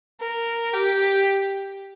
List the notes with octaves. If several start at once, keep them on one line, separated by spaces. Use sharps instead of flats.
A#4
G4